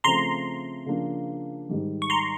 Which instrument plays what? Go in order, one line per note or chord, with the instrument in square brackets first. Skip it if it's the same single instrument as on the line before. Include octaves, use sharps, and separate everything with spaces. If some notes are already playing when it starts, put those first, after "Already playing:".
[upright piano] C#3 F3 A3 C4 [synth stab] A#5 C6
[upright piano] C#3 F3 A#3 D4
G#2 D#3 G3
[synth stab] C#6
A#5 C6